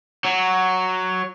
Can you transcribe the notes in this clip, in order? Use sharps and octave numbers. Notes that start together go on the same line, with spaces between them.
F#3